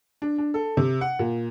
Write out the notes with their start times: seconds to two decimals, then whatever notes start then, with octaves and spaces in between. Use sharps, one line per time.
0.22 D4
0.38 D4
0.54 A4
0.77 C3
1.01 F#5
1.19 A#2